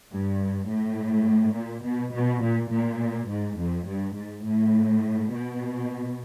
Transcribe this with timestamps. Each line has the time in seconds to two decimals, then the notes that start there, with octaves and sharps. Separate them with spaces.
0.12 G2
0.69 A2
1.56 A#2
1.85 B2
2.14 B2
2.44 A#2
2.72 A#2
3.29 G#2
3.59 F2
3.87 G2
4.16 G#2
4.45 A2
5.32 B2